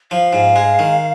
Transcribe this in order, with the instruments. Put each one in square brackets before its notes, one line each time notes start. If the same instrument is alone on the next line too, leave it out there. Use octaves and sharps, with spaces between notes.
[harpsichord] F3 [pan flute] F5
[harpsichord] G#2
G#3
D#3